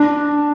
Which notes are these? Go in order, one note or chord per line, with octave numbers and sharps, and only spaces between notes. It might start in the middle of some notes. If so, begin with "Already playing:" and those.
Already playing: D4